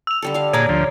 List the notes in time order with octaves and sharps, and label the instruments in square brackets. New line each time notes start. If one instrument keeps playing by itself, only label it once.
[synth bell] E6 F7
[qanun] D3 G3 A4
G3 F5
[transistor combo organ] A#2 G#4 [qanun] A#4 D5 D6 [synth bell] C#5 A#5
[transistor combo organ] D2 F3